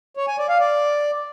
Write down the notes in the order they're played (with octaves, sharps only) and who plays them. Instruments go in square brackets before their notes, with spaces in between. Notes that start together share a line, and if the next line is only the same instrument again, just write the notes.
[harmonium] C#5
G#5
D5
F5
D5